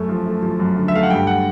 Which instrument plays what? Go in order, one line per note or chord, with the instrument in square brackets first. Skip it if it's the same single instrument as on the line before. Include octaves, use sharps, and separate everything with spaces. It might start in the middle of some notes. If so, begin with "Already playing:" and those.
Already playing: [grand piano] F#2 A3
F3
A3
F3
F#2
D3
E5
A3 F5
F#5
G2 G5
F#5